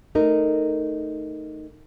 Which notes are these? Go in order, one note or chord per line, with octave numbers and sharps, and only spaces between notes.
A3 D#4 A#4